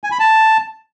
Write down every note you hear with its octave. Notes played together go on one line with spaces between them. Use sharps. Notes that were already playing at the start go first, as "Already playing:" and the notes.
G#5
B5
A5